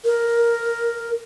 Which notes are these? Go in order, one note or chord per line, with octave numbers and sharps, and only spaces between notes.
A#4